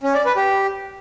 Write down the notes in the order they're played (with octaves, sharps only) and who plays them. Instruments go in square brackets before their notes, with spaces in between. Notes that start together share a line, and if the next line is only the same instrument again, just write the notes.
[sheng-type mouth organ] C#4
D5
B4
G4